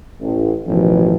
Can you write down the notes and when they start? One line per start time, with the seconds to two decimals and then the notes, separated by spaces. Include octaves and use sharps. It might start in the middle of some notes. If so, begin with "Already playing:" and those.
0.20 A1
0.67 A1 D#2 B2 F3